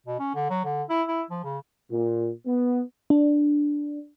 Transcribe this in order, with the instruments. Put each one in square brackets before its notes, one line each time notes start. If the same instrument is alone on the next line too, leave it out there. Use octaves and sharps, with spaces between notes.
[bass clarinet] B2
C#4
D3
F#3
D3
E4
E4
F3
C#3
[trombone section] A#2
B3
[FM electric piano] D4